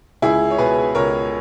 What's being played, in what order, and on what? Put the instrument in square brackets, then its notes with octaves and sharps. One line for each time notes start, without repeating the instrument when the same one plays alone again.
[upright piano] C#2 E4 G#4
C#5
B2 G#4 B4
C#2 A#4 C#5